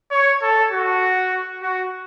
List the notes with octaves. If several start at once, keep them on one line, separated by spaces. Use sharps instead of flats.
C#5
A4
F#4
F#4